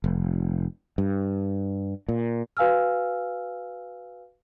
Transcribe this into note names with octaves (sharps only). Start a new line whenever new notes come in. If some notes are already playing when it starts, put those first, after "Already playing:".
F1
G2
A#2
F#4 B4 F5 G#5 E6 F6